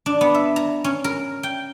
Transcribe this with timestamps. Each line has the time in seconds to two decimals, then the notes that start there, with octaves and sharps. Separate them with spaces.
0.06 D4
0.21 B3
0.34 E5
0.56 A#5
0.84 C#4
1.04 A#4
1.43 G5